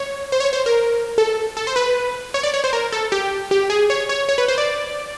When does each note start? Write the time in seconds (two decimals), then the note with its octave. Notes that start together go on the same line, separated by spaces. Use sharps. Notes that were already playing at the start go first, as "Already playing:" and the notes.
Already playing: C#5
0.32 C5
0.40 C#5
0.53 C5
0.66 A#4
1.18 A4
1.57 A4
1.67 C5
1.76 B4
2.34 C#5
2.43 D5
2.54 C#5
2.64 C5
2.73 A#4
2.92 A4
3.12 G4
3.51 G4
3.70 G#4
3.90 C#5
4.09 C#5
4.29 C#5
4.38 B4
4.48 C5
4.58 D5